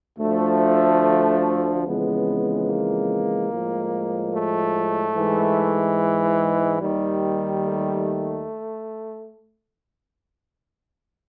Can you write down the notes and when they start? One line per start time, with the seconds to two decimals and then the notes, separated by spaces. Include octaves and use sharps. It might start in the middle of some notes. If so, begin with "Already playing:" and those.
0.19 D2 D3 F3 A3
1.84 F2 C#3 E3 G#3 B3
2.67 A#3
3.50 A2 F3 G#3
4.32 A3
5.15 G#2 E3 G#3
6.80 D#2 D#3 G3
7.63 A3